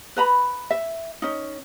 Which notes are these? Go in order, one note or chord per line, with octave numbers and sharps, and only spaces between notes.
B4 A#5 B5
E5
C#4 D#4